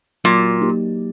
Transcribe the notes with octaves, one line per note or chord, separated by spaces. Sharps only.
A#2 F#3
A#3 D#4 G4